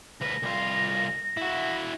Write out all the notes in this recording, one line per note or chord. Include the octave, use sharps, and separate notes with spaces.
D2 B4 A#6
C2 F4
E4 F#4